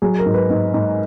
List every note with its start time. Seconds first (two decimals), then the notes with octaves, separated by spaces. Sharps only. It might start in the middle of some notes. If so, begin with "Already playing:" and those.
0.02 F#3 G#4
0.19 A#4
0.26 G#2
0.34 B4
0.50 G#2
0.74 G#2